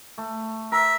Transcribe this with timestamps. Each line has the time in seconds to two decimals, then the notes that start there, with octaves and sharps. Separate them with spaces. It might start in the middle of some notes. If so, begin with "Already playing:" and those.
0.18 A3
0.72 A#4 E5